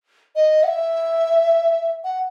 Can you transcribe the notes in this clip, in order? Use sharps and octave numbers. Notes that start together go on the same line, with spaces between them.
D#5
F#5
E5
F#5